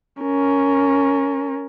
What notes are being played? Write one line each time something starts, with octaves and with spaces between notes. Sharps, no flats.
C#4 A#4